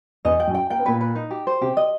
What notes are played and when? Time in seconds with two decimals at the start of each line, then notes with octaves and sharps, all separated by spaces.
0.25 E2 E3 D#5
0.40 G5
0.47 F#2 F#3
0.54 G5
0.70 A#3 G5
0.79 B3
0.86 A#2 A#3 B4
1.01 B4
1.15 D#4
1.31 G4
1.47 C5
1.61 C3 C4 G4
1.77 D#5